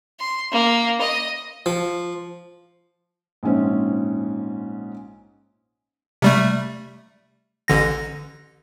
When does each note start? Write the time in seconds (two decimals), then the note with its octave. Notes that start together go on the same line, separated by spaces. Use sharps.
0.20 C6
0.52 A#3
1.01 D#5
1.66 F3
3.43 A#1 G#2 C#4 C5
6.22 C3 G3 A3
7.68 A1 D3 A#6